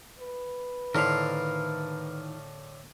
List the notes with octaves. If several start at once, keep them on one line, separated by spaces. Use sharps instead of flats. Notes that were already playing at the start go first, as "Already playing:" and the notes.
B4
A2 D3 D#3 E4 A#4 C5 F5